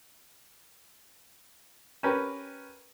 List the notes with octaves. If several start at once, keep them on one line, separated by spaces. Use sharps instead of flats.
C#4 G4 A#4 B4